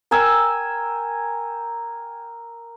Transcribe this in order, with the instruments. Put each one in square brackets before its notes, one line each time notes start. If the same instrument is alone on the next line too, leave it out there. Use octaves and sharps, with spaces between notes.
[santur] A#4 G5 G#5 E6